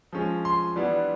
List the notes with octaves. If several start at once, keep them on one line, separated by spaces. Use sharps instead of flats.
F3 G#3 C#4
C6
E3 G3 B3 D4